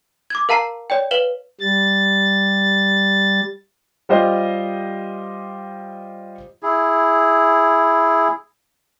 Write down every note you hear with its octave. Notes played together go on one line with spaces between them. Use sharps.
D6 G#6
A#4 F5 A5 A#5 C7
C#5 D5 G5
B4 F5 E7 F#7 G7
G3 A6
G3 F4 G4 C5 D#5
E4 G#4